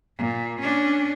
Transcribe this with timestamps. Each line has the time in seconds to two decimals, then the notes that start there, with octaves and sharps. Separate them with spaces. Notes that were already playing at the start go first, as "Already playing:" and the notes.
0.17 A#2
0.60 C#4 D4